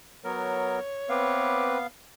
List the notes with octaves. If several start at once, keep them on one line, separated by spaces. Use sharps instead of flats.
F#3 B3 A#4 C#5
B3 C4 B4 E5 F5 D6